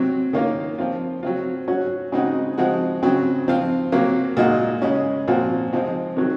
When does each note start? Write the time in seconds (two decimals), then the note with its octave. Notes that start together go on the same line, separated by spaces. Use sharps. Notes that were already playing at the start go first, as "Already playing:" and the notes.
Already playing: C3 F#3 C4
0.33 D#3 A#3 C#4 F4
0.78 F3 C4 F4
1.23 F#3 C4 F4
1.68 F#3 C#4 F#4
2.12 C#3 G#3 C4 D#4 F#4
2.58 F3 G#3 C4 F#4
3.02 C#3 F#3 C4
3.48 F3 C4 F4
3.92 C3 F#3 A#3
4.37 A#2 G#3 D#4 F#4
4.82 C#3 G#3 C#4
5.27 A#2 F3 C4 F#4
5.73 C3 F3 G#3 C4
6.17 C3 D#3 F#3